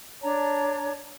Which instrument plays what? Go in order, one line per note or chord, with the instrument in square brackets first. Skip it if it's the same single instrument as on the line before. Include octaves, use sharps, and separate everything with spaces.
[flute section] D4 C#5 A5 A#5